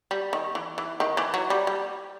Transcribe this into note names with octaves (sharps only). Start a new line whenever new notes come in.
G3
D#3
E3
E3
D#3
E3
F#3
G3
G3